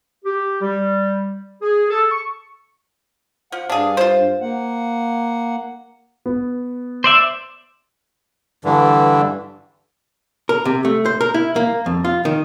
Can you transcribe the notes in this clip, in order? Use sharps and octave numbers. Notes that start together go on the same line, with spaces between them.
G4
G3
G#4
A4
C#6
F3 F#5
G2 D4 G#4 F5
F4 C5
A#3 F#5
B3
C5 D5 E5
G2 D3 E3
A#4
C3
A3
C5
A#4
E4
A#3
F2
F4
D#3